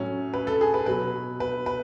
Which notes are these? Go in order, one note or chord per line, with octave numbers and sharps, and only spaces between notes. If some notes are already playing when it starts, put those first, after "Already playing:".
Already playing: A2 F#3 C#4
B4
A4
G#4
B4
B2 F#3 B4
B4
B4